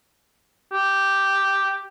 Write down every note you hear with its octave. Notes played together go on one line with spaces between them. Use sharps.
G4